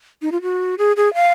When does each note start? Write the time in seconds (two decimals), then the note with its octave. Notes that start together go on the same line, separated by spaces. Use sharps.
0.22 D#4
0.32 F4
0.42 F#4
0.78 G#4
0.97 G#4
1.14 F5